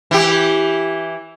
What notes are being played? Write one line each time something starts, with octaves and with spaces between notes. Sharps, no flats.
E3 G4